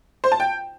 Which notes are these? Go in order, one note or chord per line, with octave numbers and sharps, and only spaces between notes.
C5
A5
G5